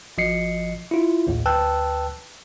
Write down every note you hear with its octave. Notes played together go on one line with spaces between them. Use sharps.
G#1 F3 D#5 C7 C#7
E4 F4
A#1 D#2 A2
D2 B4 G5 A5 E6 F#6